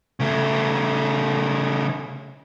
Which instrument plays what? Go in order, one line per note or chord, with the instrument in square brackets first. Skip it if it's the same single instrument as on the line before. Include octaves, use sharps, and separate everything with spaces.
[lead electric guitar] C#3 A3